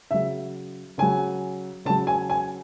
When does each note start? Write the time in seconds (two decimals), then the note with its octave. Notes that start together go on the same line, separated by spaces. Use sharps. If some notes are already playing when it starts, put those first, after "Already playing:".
0.11 C#3 F#3 E5
0.98 C#3 F#3 G#5
1.85 C#3 A5
1.90 F#3
2.07 G#5
2.30 G#5